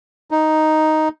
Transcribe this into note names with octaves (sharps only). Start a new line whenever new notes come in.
D#4